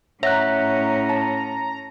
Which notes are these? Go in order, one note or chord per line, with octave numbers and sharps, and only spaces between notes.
A2 C#4 C#5 E5 F#5 A#5 F#6
A5